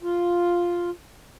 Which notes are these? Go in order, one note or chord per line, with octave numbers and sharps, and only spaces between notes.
F4